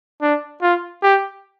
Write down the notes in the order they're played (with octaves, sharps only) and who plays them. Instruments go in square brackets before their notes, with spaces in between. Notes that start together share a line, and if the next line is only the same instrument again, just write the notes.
[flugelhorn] D4
F4
G4